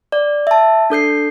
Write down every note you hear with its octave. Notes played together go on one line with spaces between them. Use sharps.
D5
E5 A5
D4 A4 G6 C7